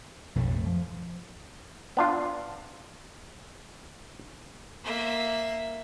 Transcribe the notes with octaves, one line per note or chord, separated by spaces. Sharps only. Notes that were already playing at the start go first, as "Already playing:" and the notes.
B1 F2 A2 A3
F3
B3 D4 F4
A#3 E5